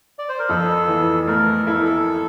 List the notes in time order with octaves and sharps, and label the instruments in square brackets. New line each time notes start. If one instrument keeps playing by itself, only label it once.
[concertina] D5
C5
A#4
[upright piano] F2 [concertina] A4
[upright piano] E3
[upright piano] A3 [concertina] A#4
[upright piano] E4 [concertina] A4
[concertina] A#4
A4